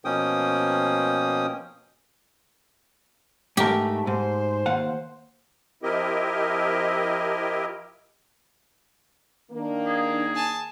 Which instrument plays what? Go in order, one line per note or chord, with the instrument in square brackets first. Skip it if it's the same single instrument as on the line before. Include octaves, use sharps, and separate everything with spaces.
[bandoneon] B2 F3 A#3 C#4 G5 D#6
[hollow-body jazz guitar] G#2 A#4 [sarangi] A3 [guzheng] G4
[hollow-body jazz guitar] G#2 [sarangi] C5
[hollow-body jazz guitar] D#2 F5 F#5
[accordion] F3 C4 E4 G4 A#4 D#5
[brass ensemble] D#3 A#3 [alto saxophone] D4
[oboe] G#4
[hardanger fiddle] G#5 A5